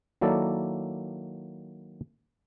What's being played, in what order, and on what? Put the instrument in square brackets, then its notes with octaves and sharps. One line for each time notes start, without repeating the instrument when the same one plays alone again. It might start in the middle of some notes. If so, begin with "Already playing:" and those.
[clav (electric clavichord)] D#3 F#3 A#3 E4 A4 D5